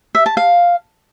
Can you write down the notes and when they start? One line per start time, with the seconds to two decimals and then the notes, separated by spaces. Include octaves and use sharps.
0.15 E5
0.26 A5
0.37 F5